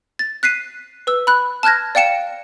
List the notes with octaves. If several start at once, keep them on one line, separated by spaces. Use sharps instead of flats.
A6
F#6 B6 C7 D#7
B4 E6
B5 F#6
A5 F6 F#6 G#6 A#6
D5 F5 G5 C#7 E7